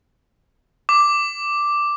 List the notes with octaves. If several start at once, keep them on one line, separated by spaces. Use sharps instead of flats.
D6